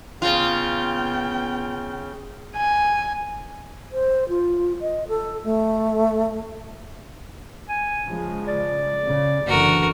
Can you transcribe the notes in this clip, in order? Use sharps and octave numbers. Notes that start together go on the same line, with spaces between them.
C#3 B3 F4 G5
G#5
C5
F4
D#5
A4
A3
G#5
C#3 F3 G#3
D5
C#3
F#1 D3 E3 F#4 A#4